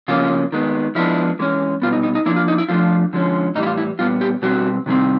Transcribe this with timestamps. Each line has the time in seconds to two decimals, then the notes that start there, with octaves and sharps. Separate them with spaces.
0.08 C#3 F3 A#3 C#4 F4
0.52 D#3 G#3 B3
0.95 F3 G#3 B3 D4 E4
1.39 E3 G#3 C#4
1.82 B2 G3 B3 F4
1.93 D#4
2.03 D#4
2.15 D#4
2.26 F3 A#3 D4 E4
2.36 F4
2.48 D#4
2.58 E4
2.69 F3 A3 D4 F4
3.13 D3 F3 G#3 C#4
3.55 A2 E3 G3 D#4
3.63 E4
3.66 F4
3.78 E4
3.99 A#2 G3 B3 F4
4.21 G4
4.42 B2 G3 C4 F#4
4.86 C3 D#3 G3 C4